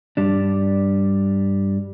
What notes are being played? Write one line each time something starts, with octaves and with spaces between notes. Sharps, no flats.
G2 G3 D4